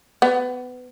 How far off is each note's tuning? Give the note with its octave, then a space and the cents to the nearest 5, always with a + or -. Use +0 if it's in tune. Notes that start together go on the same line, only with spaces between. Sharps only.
B3 +25